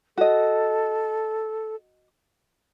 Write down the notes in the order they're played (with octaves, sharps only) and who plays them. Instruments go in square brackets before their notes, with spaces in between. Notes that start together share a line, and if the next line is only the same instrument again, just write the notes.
[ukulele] F#4 D#5 [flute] A4